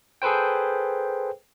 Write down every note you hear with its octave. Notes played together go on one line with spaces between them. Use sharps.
G#4 A4 B4 C5 G5